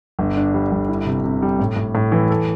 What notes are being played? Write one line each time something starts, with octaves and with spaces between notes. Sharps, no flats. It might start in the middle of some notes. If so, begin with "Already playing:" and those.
G1
D4
G3
G1
E4
C3
C3
G3
A2
A2
A2
E3
A4